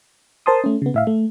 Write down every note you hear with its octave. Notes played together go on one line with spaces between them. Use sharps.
A#4 C5 A5 C6 D#6
A3 C#4
C#3 B3
A2 E5 F5
A3